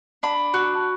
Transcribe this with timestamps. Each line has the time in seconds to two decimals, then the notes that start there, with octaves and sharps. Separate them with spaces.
0.23 D4 B5
0.54 F#4